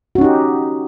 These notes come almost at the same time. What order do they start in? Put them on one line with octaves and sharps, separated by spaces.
F#4 C#4 D#4 G4